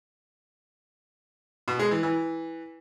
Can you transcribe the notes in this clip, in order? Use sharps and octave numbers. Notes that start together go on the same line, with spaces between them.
B2
G#3
E3
E3